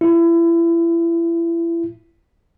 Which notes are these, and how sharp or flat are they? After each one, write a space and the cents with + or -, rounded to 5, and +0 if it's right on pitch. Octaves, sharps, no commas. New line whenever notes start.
E4 +30